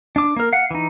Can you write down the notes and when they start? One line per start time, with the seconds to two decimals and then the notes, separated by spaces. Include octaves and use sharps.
0.16 D4 D6
0.36 A#3 A#4
0.53 F5 F#5
0.71 E3 D#4